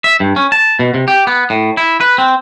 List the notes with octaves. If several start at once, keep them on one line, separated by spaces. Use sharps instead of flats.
E5
G2
C#4
A5
B2
C3
G4
B3
A2
E4
B4
C4